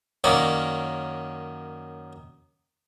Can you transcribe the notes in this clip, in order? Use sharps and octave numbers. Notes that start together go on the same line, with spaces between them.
F#2 D#3 A#3 C#4 D5